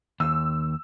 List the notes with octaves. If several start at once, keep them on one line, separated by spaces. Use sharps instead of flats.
D#2 E6